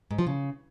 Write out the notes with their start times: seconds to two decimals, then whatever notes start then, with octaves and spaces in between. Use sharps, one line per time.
0.11 G#2
0.19 F3
0.27 C#3